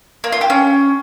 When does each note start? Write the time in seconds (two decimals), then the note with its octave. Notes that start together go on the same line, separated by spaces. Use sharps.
0.24 A#3
0.32 F4
0.41 G4
0.50 C#4